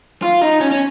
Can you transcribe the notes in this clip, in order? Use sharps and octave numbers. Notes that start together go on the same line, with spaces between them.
F4
D#4
C#4
C#4